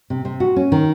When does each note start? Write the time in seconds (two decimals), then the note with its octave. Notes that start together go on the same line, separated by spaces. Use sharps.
0.10 C3
0.25 C3
0.40 F#4
0.56 C#4
0.72 D#3